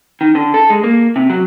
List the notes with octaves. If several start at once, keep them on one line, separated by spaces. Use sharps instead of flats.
D#3
D3
A4
G#3
A#3
C3
F#3